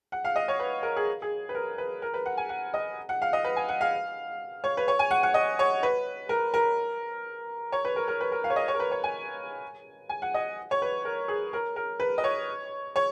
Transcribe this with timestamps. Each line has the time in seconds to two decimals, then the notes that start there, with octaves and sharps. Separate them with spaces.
0.12 F#5
0.25 F5
0.36 D#5
0.48 C#5
0.60 B4
0.83 A#4
0.96 G#4
1.22 G#4
1.49 B4
1.55 A#4
1.78 B4
2.02 A#4
2.14 B4
2.26 F#5
2.37 G#5
2.49 F#5
2.74 D#5
3.09 F#5
3.22 F5
3.33 D#5
3.44 B4
3.56 G#5
3.69 F#5
3.81 F5
4.64 C#5
4.77 B4
4.88 C#5
4.99 G#5
5.11 F#5
5.23 F#5
5.34 D#5
5.59 C#5
5.83 B4
6.29 A#4
6.54 A#4
7.72 C#5
7.85 B4
7.96 A#4
8.08 A#4
8.21 B4
8.32 A#4
8.44 F5
8.50 C#5
8.56 D#5
8.68 C#5
8.75 A#4
8.80 B4
8.91 C#5
9.04 G#5
10.09 G#5
10.22 F#5
10.34 D#5
10.71 C#5
10.82 B4
11.05 A#4
11.28 G#4
11.53 A#4
11.76 A#4
12.00 B4
12.18 D#5
12.24 C#5
12.96 C#5